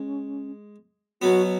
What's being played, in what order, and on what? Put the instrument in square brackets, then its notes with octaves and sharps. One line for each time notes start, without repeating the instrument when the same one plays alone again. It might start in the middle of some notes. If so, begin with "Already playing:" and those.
Already playing: [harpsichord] G#3 [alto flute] C#4
[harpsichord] B2 F#3 B3 [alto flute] F#4